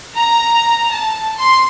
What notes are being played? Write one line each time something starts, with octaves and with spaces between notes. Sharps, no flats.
A#5
A5
C6